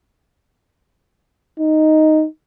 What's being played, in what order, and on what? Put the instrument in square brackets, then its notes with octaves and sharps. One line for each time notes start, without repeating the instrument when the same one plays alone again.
[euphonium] D#4